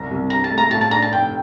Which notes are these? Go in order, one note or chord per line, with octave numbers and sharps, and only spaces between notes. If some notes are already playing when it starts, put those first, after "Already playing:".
Already playing: C2 C4 A#5
C2
G2 A#5
A5
A3
A#5
A2 A5
A5
D4 A#5
A5
F1 G5